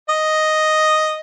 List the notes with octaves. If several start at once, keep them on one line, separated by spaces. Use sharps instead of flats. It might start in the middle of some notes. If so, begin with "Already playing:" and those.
D#5